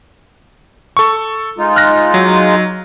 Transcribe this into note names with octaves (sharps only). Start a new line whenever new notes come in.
A4 C#6
G#3 D#4 F4
F6 F#6 A#6
F#3